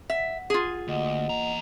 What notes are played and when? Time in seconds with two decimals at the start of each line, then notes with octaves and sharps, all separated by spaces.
0.10 E5 F#5
0.50 F4 G#4
0.88 D2 A#3 D#5 F#5
1.29 E2 A#5